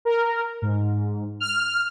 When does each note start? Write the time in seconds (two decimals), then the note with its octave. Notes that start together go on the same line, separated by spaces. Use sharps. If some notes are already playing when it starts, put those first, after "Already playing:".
0.05 A#4
0.62 G#2
1.40 F6